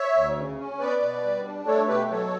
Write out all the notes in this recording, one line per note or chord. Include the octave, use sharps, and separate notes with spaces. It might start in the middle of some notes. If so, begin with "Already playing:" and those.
Already playing: C#5 E5
D2
C#3
C#4
B3 B4 D5
B2
G3
D4
A3 A4 C#5
B2 G4 B4
F#3 A4 C#5